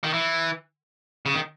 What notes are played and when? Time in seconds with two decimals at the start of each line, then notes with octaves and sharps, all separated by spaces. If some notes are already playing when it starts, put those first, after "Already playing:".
0.04 D#3
0.13 E3
1.26 C#3
1.35 D#3